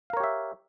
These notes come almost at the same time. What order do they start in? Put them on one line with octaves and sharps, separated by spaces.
F5 A#4 C#5 G4 E5